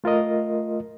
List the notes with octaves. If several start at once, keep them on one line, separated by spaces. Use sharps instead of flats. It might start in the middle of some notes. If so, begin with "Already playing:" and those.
A3 F4 A#4 D#5